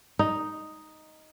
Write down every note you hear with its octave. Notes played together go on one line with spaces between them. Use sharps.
D#4